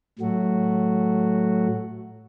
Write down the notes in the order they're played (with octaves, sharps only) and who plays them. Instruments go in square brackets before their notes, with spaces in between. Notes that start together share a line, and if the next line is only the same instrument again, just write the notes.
[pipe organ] A2 F#3 A3 F#4